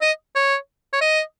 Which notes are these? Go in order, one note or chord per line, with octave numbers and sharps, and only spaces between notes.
D#5
C#5
C#5
D#5